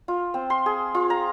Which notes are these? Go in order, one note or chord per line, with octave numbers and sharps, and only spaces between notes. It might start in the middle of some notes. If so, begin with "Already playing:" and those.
F4
C4
C6
G#4
F4
A#5